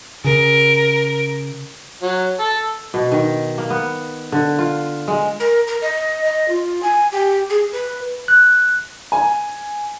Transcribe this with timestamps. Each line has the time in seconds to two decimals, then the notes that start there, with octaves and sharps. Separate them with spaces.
0.24 C#3 A#4
2.02 F#3
2.39 A4
2.94 B2
3.12 D#3
3.58 A#3
3.70 B3
4.32 D3
4.58 F4
5.08 G#3
5.40 A#4
5.68 A#4
5.82 D#5
6.25 D#5
6.48 F4
6.83 G#5
7.12 G4
7.50 G#4
7.73 B4
8.28 F#6
9.12 G#5